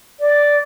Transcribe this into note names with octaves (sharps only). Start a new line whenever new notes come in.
D5